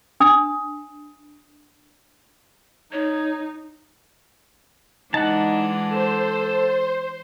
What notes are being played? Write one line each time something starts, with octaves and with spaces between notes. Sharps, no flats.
D4 D#6
D#4 C#5
E3 G#3 D4 D#4 F#5 A5
A4 C5